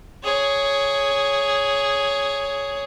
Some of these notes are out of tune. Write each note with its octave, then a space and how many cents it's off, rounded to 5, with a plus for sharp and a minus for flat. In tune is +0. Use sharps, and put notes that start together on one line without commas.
G#4 +0 C#5 +10